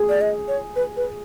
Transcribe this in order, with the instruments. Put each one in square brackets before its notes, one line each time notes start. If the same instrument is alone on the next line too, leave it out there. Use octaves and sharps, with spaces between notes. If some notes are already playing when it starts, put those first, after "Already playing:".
Already playing: [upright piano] G#4
[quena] D5
D#5
C#5
B4
B4